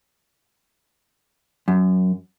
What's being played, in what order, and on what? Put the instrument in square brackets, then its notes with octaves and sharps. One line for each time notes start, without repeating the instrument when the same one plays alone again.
[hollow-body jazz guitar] F#2